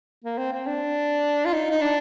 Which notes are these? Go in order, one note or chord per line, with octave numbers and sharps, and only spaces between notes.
A#3
C4
C4
D4
F4
D#4
D#4
D4